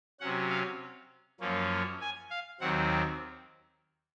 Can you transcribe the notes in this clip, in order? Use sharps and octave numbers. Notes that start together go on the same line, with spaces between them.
C3 F#3 C#4 F#5
F5
F#2 F3 A#3 C#4
G#5
F5
D#2 D#3 F#3 C4 F#5